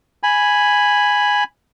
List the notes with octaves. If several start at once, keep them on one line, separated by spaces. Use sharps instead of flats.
G#5 B5